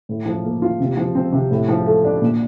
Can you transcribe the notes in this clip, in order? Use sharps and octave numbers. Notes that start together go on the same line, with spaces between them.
A2
F3
A#3
F4
C3
F3
C4
C3
A2
F3
A3
D4
A#2